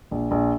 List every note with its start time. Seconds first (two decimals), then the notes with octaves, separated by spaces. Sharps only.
0.11 A#1
0.31 A#1